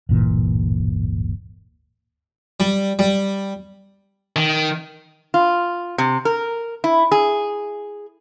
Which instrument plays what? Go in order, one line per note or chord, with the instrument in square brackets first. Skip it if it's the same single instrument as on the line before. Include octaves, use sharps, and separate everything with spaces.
[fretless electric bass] D1 G1 A#2 E3
[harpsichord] G3
G3
[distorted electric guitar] D#3
[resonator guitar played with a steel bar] F4
C3
A#4
E4
G#4